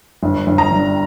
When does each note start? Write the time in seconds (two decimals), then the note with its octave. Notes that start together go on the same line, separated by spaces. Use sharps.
0.23 G1
0.47 G1
0.58 A#5
0.71 G2